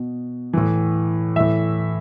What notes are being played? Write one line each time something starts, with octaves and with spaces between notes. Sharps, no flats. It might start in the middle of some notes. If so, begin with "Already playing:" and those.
Already playing: B2
A2 E3
A2 E3 E5